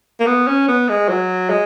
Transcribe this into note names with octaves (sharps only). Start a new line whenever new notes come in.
A#3
B3
C#4
B3
G#3
F#3
G#3